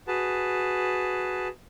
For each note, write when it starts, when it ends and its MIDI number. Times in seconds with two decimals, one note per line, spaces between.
0.07 1.48 66
0.07 1.48 68
0.07 1.48 71
0.07 1.48 81